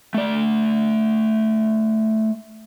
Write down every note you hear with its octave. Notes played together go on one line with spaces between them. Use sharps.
A3 D5